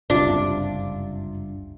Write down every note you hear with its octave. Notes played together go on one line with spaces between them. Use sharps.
F#1 C#2 G2 C3 D4 F4